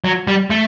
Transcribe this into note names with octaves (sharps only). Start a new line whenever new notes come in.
F#3
G3
A3